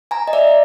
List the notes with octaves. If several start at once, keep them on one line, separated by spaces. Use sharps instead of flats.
G#5 A#5
D#5
D5 E5
D5